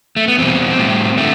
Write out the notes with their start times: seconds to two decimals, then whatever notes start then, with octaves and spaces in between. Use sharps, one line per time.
0.16 A3
0.28 B3
0.38 E2 B2 G3 C4
0.78 A2 G3
1.17 D3 G3 A3